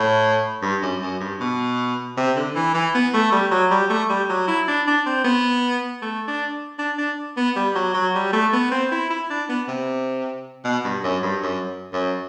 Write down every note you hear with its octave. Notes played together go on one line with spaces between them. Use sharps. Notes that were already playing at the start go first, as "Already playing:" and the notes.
Already playing: A2
G2
F#2
F#2
G2
B2
C3
D3
E3
E3
B3
A3
G3
F#3
G3
A3
G3
F#3
E4
D4
D4
C4
B3
A3
D4
D4
D4
B3
G3
F#3
F#3
G3
A3
B3
C4
E4
E4
D4
B3
C3
B2
G2
F#2
G2
F#2
F#2